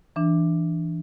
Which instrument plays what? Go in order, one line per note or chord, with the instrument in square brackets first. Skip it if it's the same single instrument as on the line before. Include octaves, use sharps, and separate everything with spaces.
[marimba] E3 D4